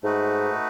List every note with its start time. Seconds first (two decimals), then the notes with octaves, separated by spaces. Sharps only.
0.03 G#2 A3 D#4 F#4 B4